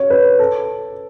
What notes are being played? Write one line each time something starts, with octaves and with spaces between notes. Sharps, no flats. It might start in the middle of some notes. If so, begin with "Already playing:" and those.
Already playing: C#5
B4
A4